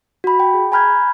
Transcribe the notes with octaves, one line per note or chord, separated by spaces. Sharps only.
F#4 B5
G5
G#4
G#5 A#5 B5 F6 G6 G#6